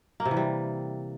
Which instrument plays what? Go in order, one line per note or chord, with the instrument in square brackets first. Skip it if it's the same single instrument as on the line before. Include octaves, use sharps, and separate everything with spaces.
[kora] A#3
C3
E3
G3